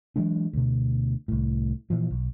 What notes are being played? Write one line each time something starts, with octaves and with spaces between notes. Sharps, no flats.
E3 F#3 G#3 D4
D2 B2
C2 A2
A#2 E3 F3
B1